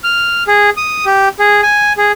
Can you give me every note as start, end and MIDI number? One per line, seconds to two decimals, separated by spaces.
0.04 0.43 89
0.48 0.70 68
0.77 1.05 87
1.06 1.29 67
1.39 1.61 68
1.63 1.93 80
1.97 2.12 68